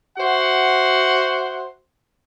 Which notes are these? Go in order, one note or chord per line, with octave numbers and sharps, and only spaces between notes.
F#4 C5 E5 F#5